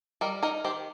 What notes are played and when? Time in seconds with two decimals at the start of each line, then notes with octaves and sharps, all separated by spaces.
0.21 G3 A#4 D#5
0.43 D#4 A#4 D#5
0.64 D#3 G4 C5